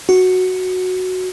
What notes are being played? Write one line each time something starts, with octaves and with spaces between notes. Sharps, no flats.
F#4